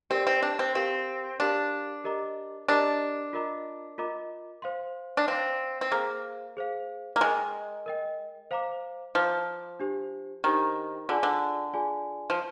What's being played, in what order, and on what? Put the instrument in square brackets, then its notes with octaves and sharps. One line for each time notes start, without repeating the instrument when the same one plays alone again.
[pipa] C4 [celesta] G4 A#4 D5
[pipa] C4
D4
C4
[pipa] C4 [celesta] G4 A#4 F5 C6
[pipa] D4 [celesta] G4 A#4 F5 C6
[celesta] G4 A#4 D#5 A#5 D6
[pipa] D4 [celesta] G4 A#4 D#5 A#5 D6
[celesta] F4 A#4 D#5 A#5 D6
F4 A#4 D#5 A#5 D6
C5 F5 C6
[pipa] D4
[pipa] C4 [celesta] C5 F5 C6
[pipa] C4
[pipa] A#3 [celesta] G#4 C5 F5
[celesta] G#4 C5 F5
[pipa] A#3
[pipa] G#3 [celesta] A#4 D#5 G5
[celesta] A#4 D#5 G5
C5 F5 A#5 D6
[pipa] F3 [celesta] C5 F5 A#5 D6
[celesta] D4 G4 C5
[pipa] D#3 [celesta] D4 G4 C5
[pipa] D3 [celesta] F4 G#4 D5 G#5
[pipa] D3
[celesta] F4 G#4 D5 G#5
[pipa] F3